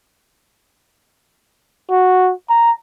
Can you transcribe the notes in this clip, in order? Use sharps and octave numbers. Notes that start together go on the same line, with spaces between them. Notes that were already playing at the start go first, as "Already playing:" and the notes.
F#4
A#5